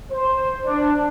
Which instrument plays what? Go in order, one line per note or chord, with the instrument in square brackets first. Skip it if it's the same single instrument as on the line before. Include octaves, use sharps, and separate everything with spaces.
[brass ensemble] C5
D4